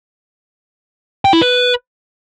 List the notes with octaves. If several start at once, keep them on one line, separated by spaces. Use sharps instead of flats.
G5
E4
B4